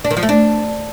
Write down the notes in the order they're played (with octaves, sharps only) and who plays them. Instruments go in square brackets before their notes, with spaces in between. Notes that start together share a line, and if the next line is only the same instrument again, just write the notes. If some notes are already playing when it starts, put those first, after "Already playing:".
[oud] D4
D#3
F3
A3
D4